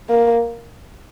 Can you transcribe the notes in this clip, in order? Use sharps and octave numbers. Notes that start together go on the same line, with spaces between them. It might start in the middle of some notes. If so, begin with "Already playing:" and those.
A#3